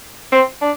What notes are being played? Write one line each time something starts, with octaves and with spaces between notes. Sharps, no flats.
C4
D4